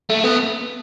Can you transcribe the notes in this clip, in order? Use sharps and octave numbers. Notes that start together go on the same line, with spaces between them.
A3
B3